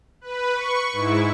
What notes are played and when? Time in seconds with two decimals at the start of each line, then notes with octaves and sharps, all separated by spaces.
0.21 B4
0.55 C#6
0.93 G#2 E4